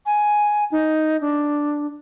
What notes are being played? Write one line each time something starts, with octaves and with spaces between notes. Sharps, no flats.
G#5
D#4
D4